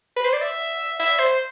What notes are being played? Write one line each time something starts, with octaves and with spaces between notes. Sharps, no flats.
B4
C5
D5
E5
E5
C5